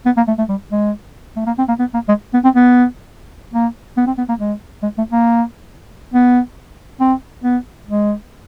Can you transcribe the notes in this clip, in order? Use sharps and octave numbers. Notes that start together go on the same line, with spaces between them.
B3
A#3
A3
A3
G3
G#3
A3
A#3
C4
A#3
B3
A#3
G#3
B3
C4
B3
A#3
B3
C4
B3
A#3
G#3
G#3
A3
A#3
B3
C4
B3
G#3